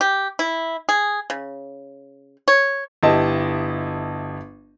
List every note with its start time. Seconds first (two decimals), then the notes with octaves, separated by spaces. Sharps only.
0.01 G4
0.39 E4
0.89 G#4
1.30 C#3
2.48 C#5
3.03 G1 E4 G4 D#5 A5